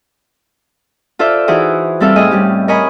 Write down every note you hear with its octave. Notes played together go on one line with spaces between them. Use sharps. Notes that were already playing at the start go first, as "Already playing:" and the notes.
F4 A4 C5 D5 E5
E3 D#4 E4 F#4 G#4 C5
G3 C4 A4 E5 F5
A2 G#4 D#5 G#5
A2 G3 C#4 G4
A#4 C#5 D#5 G#5 B5